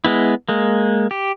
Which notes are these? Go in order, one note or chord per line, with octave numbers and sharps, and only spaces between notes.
G#3 B3 E4
G#3 A#3
G4